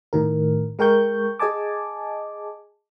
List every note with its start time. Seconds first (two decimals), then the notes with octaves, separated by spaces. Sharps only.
0.13 A2 D#3 A#4
0.79 G#3 A#4 G5 C#6 G6
1.39 G#4 D#5 G#5 A5 D6